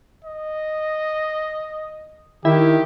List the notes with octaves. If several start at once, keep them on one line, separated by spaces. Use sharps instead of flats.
D#5
D#3 E4 G4